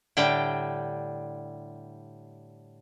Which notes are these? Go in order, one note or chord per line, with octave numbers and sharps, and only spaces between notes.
A2 D3 G3 G5